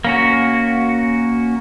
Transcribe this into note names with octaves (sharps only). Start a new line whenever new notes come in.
A#3 C#4 F#4